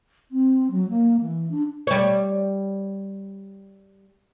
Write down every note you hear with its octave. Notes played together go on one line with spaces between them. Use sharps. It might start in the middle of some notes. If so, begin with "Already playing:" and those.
C4
F#3
A#3
E3
D4
G3 C#5